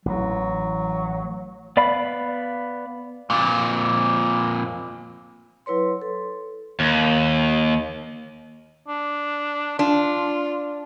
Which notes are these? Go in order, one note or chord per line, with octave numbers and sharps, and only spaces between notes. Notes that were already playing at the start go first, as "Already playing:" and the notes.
A1 E3 F#3
B3 D5 F5 B5
F2 A#2
F#3 E4 B4 C#5 C6
A4
D#2
D4
D4 F4